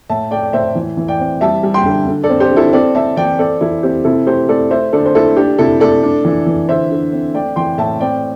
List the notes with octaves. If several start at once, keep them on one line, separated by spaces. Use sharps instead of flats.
A2 E5 A5
A3 D5 G5
D5
A2 C5 E5
E3
E3
D5 G5
C4
G3 E5 A5
G3
G5 C6
D3
D3
A4 D5
C4
G4 C5
D3
E4 A4
C4 A4 D5
C4 E5 A5
E3 D5 G5
C4 A4 D5
E3 E4 A4
C4 G4
C3 E4 A4
A3 G4 C5
A3 A4 D5
A3 C5 E5
D3 A4 D5
C5
A3 E4 A4
D4 G4
C3 E4 A4
A3 A4 D5
D4
E3
E3
D3 C5 E5
D3
C4
A3 D5 G5
E3 G5 C6
A2 E5 A5
C4 D5 G5